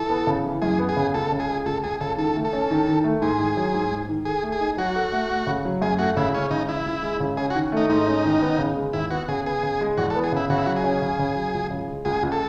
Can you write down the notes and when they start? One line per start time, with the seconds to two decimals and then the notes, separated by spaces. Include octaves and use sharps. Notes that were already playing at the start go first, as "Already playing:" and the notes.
Already playing: E3 A4
0.10 B3
0.27 C#3
0.45 E3
0.62 F#2 G#4
0.79 B3
0.89 G#4
0.97 C#3
1.14 C#2 A4
1.32 C#3
1.40 G#4
1.48 G#3
1.66 C#2 A4
1.84 C#2 G#4
2.01 C#3 A4
2.18 D#3 A4
2.36 A3
2.44 A4
2.53 C#4
2.71 D#3
2.88 D#3
3.04 A3
3.22 G#2 G#4
3.39 D#3
3.57 F#3
3.74 G#2
3.92 G#2
4.09 D#3
4.25 G#4 A4
4.43 A3
4.52 G#4
4.60 D#4
4.77 F#3 F#4
4.96 A4
5.12 A3
5.30 A3
5.47 C#3
5.65 F#3
5.82 F#2 G#4
5.99 A3 F#4
6.17 C#3 E4
6.34 G#3 C#4
6.51 C#3 D#4
6.69 E3 E4
6.86 C#2
7.03 G#3
7.20 C#3
7.37 C#4 G#4
7.50 F#4
7.55 D#3
7.72 A3 D#4
7.89 G#2 D#4
8.07 C#4
8.25 D#3
8.42 B3
8.58 C#3
8.76 G#3
8.93 D#2 E4
9.10 B3 F#4
9.28 C#3 G#4
9.45 B3 G#4
9.63 C#3
9.81 G#3
9.97 E2 F#4
10.10 A4
10.16 B3
10.24 G#4
10.32 C#3 E4
10.50 C#3 F#4
10.58 E4
10.66 F#3 F#4
10.76 G#4
10.84 C#4
11.02 C#3
11.19 C#3
11.36 F#3
11.54 C#2
11.71 C#3
11.88 G#3
12.05 C#2 G#4
12.23 C#2
12.32 A4